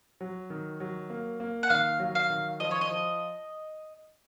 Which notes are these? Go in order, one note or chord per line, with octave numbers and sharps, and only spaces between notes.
F#3
D#3
F#3
A#3
A#3
F#5
D#3 F5
F#3
F5
D#3
F3 D#5
C#5
D#5
F3